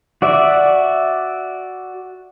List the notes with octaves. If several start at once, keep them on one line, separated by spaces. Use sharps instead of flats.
F#4 D5 E5